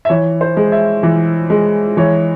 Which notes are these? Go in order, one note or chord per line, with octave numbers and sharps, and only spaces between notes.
E5
E3 C#5
C5
G#3
E5
E3
G#3
E3 C#5